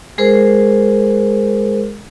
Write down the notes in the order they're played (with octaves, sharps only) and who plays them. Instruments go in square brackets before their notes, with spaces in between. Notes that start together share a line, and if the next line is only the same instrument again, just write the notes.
[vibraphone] G#3 G#4 A#4 C5